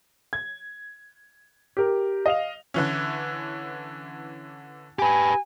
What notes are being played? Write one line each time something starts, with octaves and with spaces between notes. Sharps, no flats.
G#6
G4 A#4
D#5 F5 F7
D3 E3 C#4
G4 B4 G#5